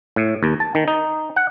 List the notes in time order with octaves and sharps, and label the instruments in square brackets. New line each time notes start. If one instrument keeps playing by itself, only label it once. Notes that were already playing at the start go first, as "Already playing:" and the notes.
[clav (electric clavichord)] A2
D#2
A5
D#3
D#4
F#5